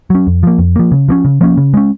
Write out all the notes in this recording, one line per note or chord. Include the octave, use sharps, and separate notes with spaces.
F#3 C#4
F2
F3 A#3
F2
F3 A#3
C#3
F3 A#3 C#4
C#3
F3 A#3 C#4
C#3
G#3 C#4